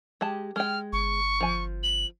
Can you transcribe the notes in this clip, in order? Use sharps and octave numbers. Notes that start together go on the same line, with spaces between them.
G#3 G4 A5
G#3 G5 F6
G1 C#6
F3 G#5
F#7